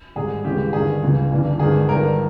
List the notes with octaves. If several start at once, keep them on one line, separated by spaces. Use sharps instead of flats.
G#1 G#2 G3 G#4
D#2 C#3 E3 G#3 G4
G1 G2 D#3 G#4
C#2 C#3 E3
G1 G2 E3
G1 G2 D#3 G#3 G#4
G1 G2 D#3 A#4